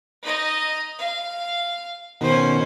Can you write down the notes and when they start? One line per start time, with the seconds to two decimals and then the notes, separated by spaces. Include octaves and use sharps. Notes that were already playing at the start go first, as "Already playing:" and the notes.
0.23 D#4 D#5
0.98 F5
2.21 B2 D#3 C#4 C5